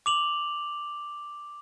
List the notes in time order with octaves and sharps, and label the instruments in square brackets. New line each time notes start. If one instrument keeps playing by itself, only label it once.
[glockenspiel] D6 F7 F#7